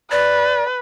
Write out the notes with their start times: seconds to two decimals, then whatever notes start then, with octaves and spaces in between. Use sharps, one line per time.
0.11 B4 D5